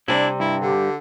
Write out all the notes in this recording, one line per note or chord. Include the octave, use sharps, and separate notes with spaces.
C3 G3 D4 E4
G2 E4
D3 G4